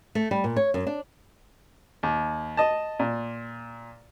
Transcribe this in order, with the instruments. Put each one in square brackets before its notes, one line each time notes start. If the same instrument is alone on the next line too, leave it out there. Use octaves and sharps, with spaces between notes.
[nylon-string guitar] A3
G3
A#2
C#5
F#2
D4
[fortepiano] D#2
D#5 A5
A#2